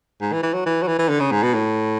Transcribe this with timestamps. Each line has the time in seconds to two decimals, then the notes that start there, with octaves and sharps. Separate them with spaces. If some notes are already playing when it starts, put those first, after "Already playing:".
0.21 G#2
0.32 E3
0.43 E3
0.54 F#3
0.66 E3
0.83 F#3
0.88 E3
0.98 E3
1.09 D3
1.20 C#3
1.31 G#2
1.43 B2
1.54 A2